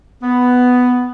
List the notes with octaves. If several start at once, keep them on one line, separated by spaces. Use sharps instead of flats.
B3